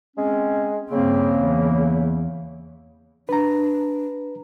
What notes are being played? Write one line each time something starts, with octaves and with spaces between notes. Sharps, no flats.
G#3 C4 C#4
G2 C#3 A#3 C4
E2
D4 B4 A#5